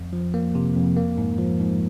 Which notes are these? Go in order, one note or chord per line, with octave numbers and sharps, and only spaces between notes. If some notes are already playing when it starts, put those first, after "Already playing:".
Already playing: F2
F3
A#3
C3
F2
A#3
G#2
F3
G#2